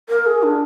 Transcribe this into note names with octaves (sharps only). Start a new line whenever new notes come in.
A#4
G#4
D4